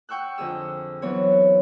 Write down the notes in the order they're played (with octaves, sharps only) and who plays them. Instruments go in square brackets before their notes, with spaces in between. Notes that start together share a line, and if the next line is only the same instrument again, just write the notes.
[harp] F#5 G5 C#6 E6 F#6
F2 D3 G#4 E6
E3 F#3 B3 C4 C#5